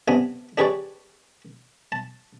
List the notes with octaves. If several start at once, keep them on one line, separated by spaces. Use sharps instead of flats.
C3 B3 D4 G#5
D4 G4 G#4 B4 C#5 D5
A5